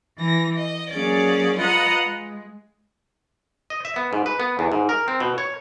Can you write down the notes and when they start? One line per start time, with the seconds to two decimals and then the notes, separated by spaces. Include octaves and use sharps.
0.19 E3 A#6
0.57 D#5
0.90 F#3 A#3 C#4 G#4 D5
1.58 F4 B4 D#5 F#5 A#5 D#6
2.04 G#3
3.70 D#5
3.85 E5
3.96 B3
4.13 G#2
4.26 B4
4.40 B3
4.59 E2
4.72 G#2
4.89 A#4
5.08 C4
5.20 B2
5.38 C#5